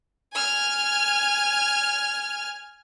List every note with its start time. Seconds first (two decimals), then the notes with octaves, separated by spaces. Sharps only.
0.34 G#5 F6